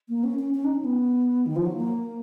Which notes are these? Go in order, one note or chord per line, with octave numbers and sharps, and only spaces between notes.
A#3
C#4
C#4
C#4
D#4
C#4
B3
D#3
F3
F#3
A#3